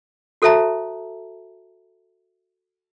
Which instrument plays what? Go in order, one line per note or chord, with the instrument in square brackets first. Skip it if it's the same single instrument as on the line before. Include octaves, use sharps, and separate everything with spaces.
[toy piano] F#4 A4 C5 E5 A5 A#5